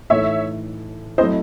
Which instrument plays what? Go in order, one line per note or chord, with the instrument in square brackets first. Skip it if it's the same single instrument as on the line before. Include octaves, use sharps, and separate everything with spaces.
[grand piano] A2 E3 A3 D#4 A4 [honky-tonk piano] C#5 E5
[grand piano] F#3 A3 C4 E4 [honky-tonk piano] C5 D#5